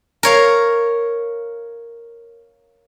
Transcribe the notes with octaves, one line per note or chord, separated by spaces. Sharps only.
A#4 C#5 F5